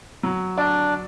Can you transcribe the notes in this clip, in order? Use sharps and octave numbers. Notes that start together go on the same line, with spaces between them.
F#3
D4 D5